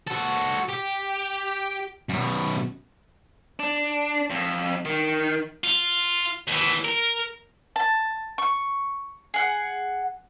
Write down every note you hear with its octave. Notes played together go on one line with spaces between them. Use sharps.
F#4 A4
G4
F#2 B2
D4
F2
D#3
F4
D#2 E3
A#4
A5
C#6
G#4 F#5